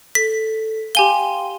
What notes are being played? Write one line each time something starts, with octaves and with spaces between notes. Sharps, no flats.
A4 B6
G4 F5 G5 G#5 C6 G7